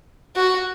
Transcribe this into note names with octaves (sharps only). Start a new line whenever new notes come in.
F#4